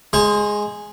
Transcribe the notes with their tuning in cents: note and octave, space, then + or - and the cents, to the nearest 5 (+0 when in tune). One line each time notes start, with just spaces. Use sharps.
G#3 +0 C5 +40 A#5 +0